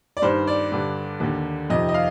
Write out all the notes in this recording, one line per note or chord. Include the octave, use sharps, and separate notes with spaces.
D5
G2 D#3 C5
D5
G2 D3
D#2 D3
F2 C3 D#3 D#5
D#5
F5